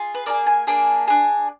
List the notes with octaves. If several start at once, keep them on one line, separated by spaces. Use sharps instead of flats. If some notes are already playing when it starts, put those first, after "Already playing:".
Already playing: F4 G#4
B4
A#3 D4 G#4 D5
G#5
A#3 D4 G#4
D4 G#4